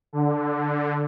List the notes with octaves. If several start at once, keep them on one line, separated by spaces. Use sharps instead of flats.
D3